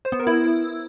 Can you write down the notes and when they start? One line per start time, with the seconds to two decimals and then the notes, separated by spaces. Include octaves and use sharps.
0.05 C5
0.12 B3
0.19 A#4
0.27 E4